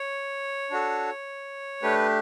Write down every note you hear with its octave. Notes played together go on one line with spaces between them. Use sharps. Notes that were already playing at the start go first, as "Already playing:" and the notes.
Already playing: C#5
D4 F#4 A4
A3 D4 G4 B4